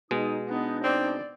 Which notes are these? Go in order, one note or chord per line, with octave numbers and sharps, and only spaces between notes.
B2 G#3 D#4 D#6
B3 D4 D#4
C4 D5